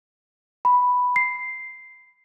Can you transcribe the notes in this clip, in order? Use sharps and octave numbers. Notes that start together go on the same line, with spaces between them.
B5
C7